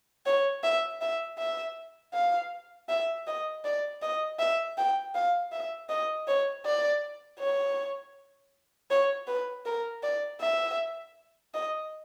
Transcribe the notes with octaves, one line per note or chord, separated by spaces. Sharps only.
C#5
E5
E5
E5
F5
E5
D#5
D5
D#5
E5
G5
F5
E5
D#5
C#5
D5
C#5
C#5
B4
A#4
D5
E5
D#5